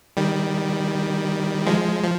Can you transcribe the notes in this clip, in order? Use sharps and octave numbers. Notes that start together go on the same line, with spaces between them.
D#3 G3
F3 G#3
F3